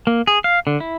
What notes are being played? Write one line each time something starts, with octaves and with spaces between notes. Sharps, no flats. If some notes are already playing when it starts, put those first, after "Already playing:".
A#3
G#4
F5
D3
E4